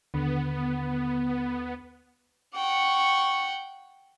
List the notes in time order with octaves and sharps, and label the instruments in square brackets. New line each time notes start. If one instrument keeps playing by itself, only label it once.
[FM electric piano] D#2 D3 [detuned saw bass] B3
[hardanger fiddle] F#5 G5 [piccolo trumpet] C#6